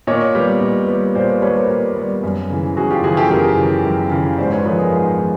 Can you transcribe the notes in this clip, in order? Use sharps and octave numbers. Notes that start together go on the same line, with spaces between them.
A#2 C#5 D#5
G3 B3
A#2
G3 B3
A#2 C5 D5
B4 C#5
G3 B3 B4 C#5
A#4 C5
A#2
G3 B3
F#2
C#3 E3
F#2 F#4 G#4
F4 G4
C#3 E3 F#4 G#4
G4 A4
F#2 G#4 A#4
C#3 E3
F#2
C#3 E3
G#2 C5 D5
B4 C#5
F3 G#3 B3 A4 B4
G#4 A#4
G#2 G#4 A#4
F3 G#3